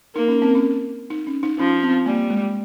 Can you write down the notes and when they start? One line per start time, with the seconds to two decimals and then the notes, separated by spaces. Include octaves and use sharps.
0.15 A#3 D#4
0.28 C#4
0.42 C4
0.55 C#4
1.10 D#4
1.27 C#4
1.43 D#4
1.59 F3 C#4
1.83 C4
2.06 G3 A#3
2.30 G#3